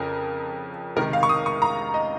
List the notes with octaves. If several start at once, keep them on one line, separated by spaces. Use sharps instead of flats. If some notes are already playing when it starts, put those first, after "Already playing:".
Already playing: F2 C#3 F3 A#4
C#2 C3 D#3 A#4
F5
C#6
D#6
C#6
A#5
D#5